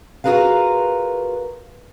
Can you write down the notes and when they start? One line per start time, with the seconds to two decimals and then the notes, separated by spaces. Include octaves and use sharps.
0.24 F4 F#4 G#4 A#4 B4 F5